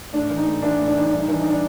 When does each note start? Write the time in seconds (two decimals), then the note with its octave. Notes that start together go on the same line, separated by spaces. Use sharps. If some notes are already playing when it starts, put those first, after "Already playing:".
0.13 A2 D4
0.30 E3
0.37 D#4
0.46 A2
0.62 E3 D4
0.79 A2
0.87 D4
0.96 E3 D#4
1.08 G2 D4
1.18 D#4
1.28 E3 D4
1.39 D#4
1.49 D4